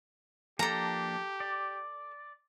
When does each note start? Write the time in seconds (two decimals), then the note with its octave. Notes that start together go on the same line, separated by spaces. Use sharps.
0.59 F3 A#3 D4 G4 A4 A#5
1.40 D5